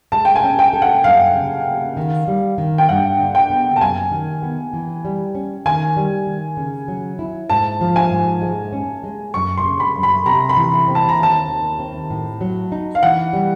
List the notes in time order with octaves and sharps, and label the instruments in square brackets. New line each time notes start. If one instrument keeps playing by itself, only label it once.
[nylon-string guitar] G#3 [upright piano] A5
[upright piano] G5
G#5
[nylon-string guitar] C#4
[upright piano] G5
[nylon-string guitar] A4
[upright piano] F#5
[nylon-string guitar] F#2 [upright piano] F5
[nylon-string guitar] C#3
A#3
D#3
G3
D#3
[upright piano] G5
[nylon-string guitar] G2 [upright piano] F#5
[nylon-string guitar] D3
[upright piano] G5
[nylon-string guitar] B3
[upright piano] A5
[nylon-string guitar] F#2 [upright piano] G#5
[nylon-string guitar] D#3
B3
E3
G3
C#4
[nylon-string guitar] D#3 [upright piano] G#5
[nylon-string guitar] G3
D#3
C#3
F#3
E4
[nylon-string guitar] G#2 [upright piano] A5
[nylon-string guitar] F3
[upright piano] G#5
[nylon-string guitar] G#2
G#3
C#4
G#3
[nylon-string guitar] F#2 [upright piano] C#6
[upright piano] C6
[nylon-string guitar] C#3
[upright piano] B5
[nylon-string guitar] F#2
[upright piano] B5
[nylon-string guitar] C3 [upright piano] A#5
[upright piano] B5
[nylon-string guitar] E3
C4
[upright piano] A5
A#5
[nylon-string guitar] D#2 [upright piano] A5
[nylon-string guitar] D#3
C4
A2
F#3
D#4
[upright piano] F5
[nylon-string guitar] E3 [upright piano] F#5
[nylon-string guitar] G3